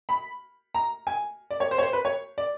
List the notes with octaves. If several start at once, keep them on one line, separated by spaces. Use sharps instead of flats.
B5
A#5
G#5
D5
C#5
C5
C#5
C5
B4
C#5
D5